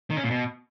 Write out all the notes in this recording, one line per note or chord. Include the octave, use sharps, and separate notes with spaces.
D#3
C#4
A#2
B2